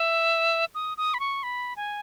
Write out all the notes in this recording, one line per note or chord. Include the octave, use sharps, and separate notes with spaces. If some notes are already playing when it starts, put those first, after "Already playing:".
Already playing: E5
D#6
D#6
B5
C#6
B5
G#5